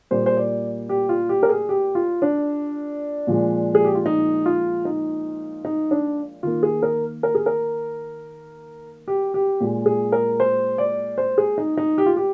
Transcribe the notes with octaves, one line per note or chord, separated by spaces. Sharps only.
A#2 G3 A#3 C5
C5
D5
G4
F4
G4
A#4
G#4
G4
F4
D4
A#2 F3 G#3
G#4
G4
F4
D#4
F4
D#4
D#4
D4
D#3 A#3 F4
G#4
A#4
A#4
G#4
A#4
G4
G4
A#2 G#3
G#4
A#4
C5
D5
C5
G#4
D#4
D#4
G4
F4
G4